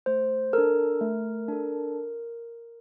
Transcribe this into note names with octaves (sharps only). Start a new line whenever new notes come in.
A3 C5
D4 A4 A#4
A3
D4 A4